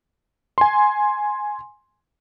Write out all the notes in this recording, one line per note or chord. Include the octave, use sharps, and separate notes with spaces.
G#5 C6